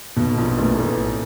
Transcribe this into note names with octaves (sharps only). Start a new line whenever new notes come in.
B1 B2
A#1 A#2
A1 A2
A1 A2